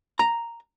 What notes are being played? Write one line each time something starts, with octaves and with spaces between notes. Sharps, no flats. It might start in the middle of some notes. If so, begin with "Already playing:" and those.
A#5